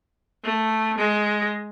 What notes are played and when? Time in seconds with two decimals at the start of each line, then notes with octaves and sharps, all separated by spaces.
0.44 A3
0.97 G#3